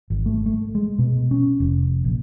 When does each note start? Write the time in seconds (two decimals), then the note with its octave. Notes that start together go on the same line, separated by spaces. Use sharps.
0.10 G#1
0.26 A3
0.46 A3
0.75 G#3
0.99 B2
1.31 C#4
1.60 F1
2.05 A#1